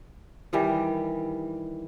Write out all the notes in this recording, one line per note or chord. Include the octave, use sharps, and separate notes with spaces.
D#3 E3 G3